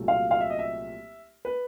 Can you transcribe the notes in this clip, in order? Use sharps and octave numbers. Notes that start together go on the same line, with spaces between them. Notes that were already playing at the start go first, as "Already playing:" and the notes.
Already playing: C2 A#2 F#3 A3
F5
F5
E5
D#5
E5
B4